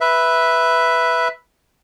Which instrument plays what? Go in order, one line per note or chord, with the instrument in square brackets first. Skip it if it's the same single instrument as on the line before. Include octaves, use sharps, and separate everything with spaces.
[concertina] B4 E5